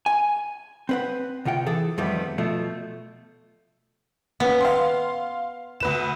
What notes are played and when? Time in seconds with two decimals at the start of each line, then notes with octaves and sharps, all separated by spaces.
0.06 G#5
0.89 C4 B4 F#5
1.45 D2 C3 F4 F#5 G5
1.66 E3 G#4 A4
1.98 F2 D#3 G3 A3 B3
2.38 B2 F3 A3
4.40 D#2 B3 C#4
4.61 F5 C6
5.80 D2 B4 E7